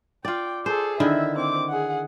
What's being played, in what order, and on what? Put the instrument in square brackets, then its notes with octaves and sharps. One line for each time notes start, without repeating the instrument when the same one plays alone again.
[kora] F4 D5 [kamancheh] G5
[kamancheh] G#4 A4 [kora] C5
[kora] D3 D#3 E4 [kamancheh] E5
[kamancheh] C4 D6
G#4 F#5